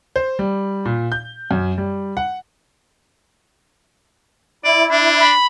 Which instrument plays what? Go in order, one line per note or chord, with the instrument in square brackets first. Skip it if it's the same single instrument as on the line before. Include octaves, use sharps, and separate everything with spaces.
[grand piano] C5
G3
A#2
G6
F#2
G3
F#5
[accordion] E4 [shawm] D5
[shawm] D4
[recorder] B5